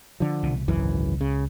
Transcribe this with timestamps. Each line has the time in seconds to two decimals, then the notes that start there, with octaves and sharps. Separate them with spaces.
0.20 D3 F3
0.43 C2 B2 E3
0.68 G#1 C#2 F#2 E3
1.21 C#3